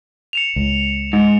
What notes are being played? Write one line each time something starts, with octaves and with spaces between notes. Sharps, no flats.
C#7 E7 F7
C#2
G#2